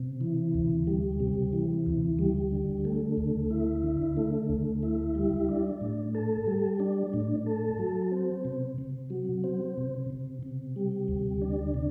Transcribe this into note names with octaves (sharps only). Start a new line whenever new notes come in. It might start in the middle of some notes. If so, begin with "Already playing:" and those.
Already playing: C3
E3
D2
G3
C3
E3
D2
G3
D3
A3
D2
E4
D3
A3
D2
E4
G3
D4
A2
A4
G3
D4
A2
A4
F#3
C4
C3
C3
F#3
C4
C3
C3
C3
G3
D2
D4
C3